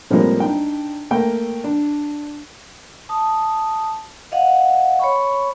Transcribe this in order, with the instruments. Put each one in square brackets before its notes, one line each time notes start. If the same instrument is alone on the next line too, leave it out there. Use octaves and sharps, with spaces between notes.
[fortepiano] A2 F3 G3 G#3 A#3 C4
D4 D#4 G5
A3 A#3 G5
D4
[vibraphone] A5 D#6
D#5 F5 F#5
C#5 B5 C#6